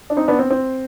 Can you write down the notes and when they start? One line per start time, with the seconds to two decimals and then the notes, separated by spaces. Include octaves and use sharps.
0.10 D4
0.17 C4 D#4
0.28 B3 D4
0.39 C4
0.50 C4